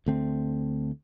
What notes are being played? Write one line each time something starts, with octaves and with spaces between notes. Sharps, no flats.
D2 D3 A3 C4